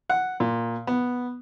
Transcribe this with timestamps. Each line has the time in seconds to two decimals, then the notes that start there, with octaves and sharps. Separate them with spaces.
0.10 F#5
0.40 A#2
0.87 B3